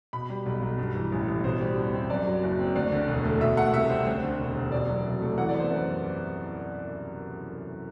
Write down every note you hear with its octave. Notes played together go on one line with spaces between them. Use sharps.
B2 B5
G3
B1
B1
G2
E3
A1
A1
B2 C5
G3
E2
C4
F#2 D5
F#3
F#1
C4
D2 D5
D3
E1
A3
B2 E5
A3 F#5
C2 E5
C4 C5
D2 C5
D3
E1
E1
B2 D5
F#3
C2
A3
E3 F#5
D5
B3
C5
F#2